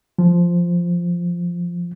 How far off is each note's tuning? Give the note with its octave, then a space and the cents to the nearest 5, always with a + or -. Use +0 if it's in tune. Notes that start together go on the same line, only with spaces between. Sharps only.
F3 -5